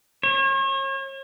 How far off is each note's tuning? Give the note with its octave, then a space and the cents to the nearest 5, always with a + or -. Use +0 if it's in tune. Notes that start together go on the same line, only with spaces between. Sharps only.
C#5 -40